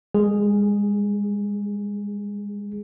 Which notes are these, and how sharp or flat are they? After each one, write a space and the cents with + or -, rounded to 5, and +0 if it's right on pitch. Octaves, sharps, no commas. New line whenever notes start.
G#3 -30 G#4 +0